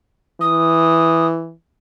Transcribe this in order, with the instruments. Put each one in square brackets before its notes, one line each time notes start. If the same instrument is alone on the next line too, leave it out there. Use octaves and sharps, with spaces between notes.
[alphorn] E3 [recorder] D#6